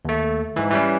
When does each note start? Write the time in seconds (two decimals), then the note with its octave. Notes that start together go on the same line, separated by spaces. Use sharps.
0.05 D#2 A3
0.56 G#2 E3
0.71 E3 G3 C#4